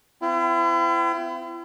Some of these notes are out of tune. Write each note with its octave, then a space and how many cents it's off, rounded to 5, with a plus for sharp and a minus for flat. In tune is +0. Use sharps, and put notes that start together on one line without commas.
C4 -35 E4 +45